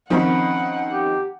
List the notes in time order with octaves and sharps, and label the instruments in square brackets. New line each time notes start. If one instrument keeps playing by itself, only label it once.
[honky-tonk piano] D#3 F3 C4 [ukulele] C#4 B5 [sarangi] F#5
[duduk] G4